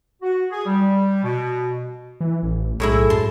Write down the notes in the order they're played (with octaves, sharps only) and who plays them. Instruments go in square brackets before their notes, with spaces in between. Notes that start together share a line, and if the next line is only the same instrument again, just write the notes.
[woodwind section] F#4
G#4
G3
B2
[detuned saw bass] E3
A1
[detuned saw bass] B1 [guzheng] A2 G#3 E4
[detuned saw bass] F#2 [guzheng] A5 C6